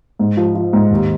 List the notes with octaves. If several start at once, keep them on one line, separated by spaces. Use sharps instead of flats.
G#2
F3
F3
G#2
D#2